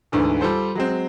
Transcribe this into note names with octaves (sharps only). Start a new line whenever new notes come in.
D2 G#2 D3 E3
G3 F4 A4 C5
F#3 G#3 C4